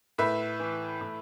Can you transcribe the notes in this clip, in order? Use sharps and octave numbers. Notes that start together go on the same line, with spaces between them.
A2 B4 E5
E3
A2